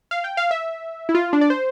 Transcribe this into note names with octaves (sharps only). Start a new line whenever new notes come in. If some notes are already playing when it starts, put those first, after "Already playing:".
F5
G5
F5
E5
E4
F4
D4
D5
C5